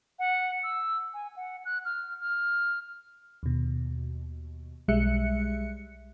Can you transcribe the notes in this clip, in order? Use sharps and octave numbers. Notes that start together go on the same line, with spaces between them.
F#5
E6
G#5
F#5
F#6
F6
F6
D#2 B2
B1 G3 G#3 E5 F#6 C#7